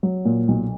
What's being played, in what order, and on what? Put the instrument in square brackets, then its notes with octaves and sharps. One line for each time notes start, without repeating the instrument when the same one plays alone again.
[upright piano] F#3
A#2
B1